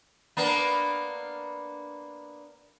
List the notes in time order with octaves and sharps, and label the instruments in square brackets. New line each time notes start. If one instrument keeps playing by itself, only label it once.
[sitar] A#3 B3 D4